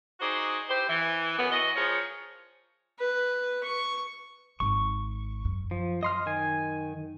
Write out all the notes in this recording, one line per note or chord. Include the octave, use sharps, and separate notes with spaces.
D#4 F#4 G#4 C5 D5
E4 G4 C5
E3
F#2 A2 B3
E3 F#4 D#5
F3 G#4 A#4 C#5
B4
C#6
G#1 C#6
F#2
F3
D#5 C6 F6
D#3 G#5